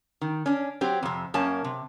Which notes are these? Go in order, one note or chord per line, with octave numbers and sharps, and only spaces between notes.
D#3
C#4 D4
F#3 C4 G4
F2 C3
F#2 A#3 C#4 A5
C3